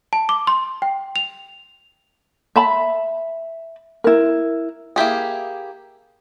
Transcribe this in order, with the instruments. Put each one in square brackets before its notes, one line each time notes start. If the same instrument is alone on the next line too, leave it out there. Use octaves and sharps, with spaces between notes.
[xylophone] A5
D6
C6
G5
F7
[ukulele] E5 A5 B5
E4 A#4
[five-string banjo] A#3 E4 G4 G#4